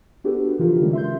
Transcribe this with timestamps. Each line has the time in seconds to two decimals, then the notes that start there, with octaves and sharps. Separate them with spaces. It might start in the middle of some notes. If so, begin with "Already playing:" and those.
0.24 B3 D4 F#4 G4 A4 B4
0.59 C#3 E3 F3 F4 G4 A#4
0.80 D#3 E3 G3 G#3 C#4
0.93 E5 C6 G6